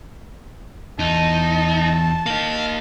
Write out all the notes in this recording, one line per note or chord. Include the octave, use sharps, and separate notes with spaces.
E2 D#4 A5
A#3 D#4 F5